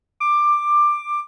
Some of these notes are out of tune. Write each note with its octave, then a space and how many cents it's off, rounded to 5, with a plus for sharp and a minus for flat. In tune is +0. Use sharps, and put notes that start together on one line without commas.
D6 +15